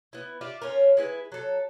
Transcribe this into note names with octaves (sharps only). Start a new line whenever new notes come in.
B3 E4
F4 G4 D5 E5
C#4 F4 A#4
G#3 E4 B4
F#3 A4